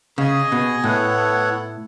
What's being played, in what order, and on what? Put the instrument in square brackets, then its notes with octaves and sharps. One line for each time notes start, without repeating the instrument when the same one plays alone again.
[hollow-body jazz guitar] C#3 [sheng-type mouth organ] G#4 D#5 G#5
[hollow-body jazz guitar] B2
[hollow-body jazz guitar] A2 [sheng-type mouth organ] B3 E4 A4 C#5 F#5